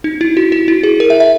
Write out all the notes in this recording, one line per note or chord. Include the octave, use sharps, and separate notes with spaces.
D#4
E4
F#4
F#4
E4
G#4
A#4
E5
E5